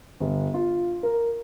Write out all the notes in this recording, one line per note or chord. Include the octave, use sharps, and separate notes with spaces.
G1
F4
A#4